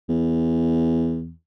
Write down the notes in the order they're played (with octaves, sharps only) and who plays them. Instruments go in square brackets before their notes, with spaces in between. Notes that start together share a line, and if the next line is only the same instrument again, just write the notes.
[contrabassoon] E2